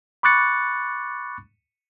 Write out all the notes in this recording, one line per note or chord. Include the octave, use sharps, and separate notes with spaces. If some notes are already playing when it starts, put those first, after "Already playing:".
B5 C#6 D6 F#6 A6 C#7